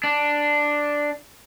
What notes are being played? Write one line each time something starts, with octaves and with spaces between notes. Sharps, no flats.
D4